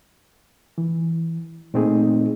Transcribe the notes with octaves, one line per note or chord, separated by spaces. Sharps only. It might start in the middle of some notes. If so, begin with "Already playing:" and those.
E3
A#2 A3 C4 D#4 G#4